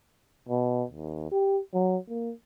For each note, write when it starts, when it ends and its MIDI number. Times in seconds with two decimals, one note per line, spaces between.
0.49 0.84 47
0.91 1.29 39
1.32 1.59 67
1.74 1.97 54
2.09 2.32 58